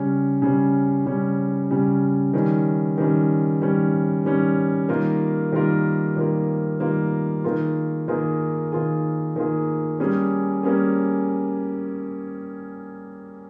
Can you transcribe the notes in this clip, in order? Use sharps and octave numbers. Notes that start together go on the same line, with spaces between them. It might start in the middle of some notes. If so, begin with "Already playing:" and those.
Already playing: C#3 G3 C#4
C#3 G3 C#4
C#3 G3 C#4
C#3 G3 C#4
D#3 G3 C#4
D#3 G3 C#4
D#3 G3 C#4
D#3 G3 C#4
D#3 G3 A#3 F4 A#4
D#3 G3 A#3 F4 A#4
D#3 G3 A#3 F4 A#4
D#3 G3 A#3 F4 A#4
D#3 A#3 F4 G#4
D#3 A#3 F4 G#4
D#3 A#3 F4 G#4
D#3 A#3 F4 G#4
G3 A#3 C#4 G#4
G3 A#3 C#4 G#4